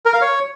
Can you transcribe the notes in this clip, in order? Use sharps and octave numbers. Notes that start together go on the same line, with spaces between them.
A#4
F5
C#5